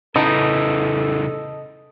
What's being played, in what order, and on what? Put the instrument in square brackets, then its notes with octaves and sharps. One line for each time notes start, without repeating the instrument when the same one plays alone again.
[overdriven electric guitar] C#3 E3 [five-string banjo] B3 D#4 [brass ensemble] A4 [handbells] D#5 A5 D#6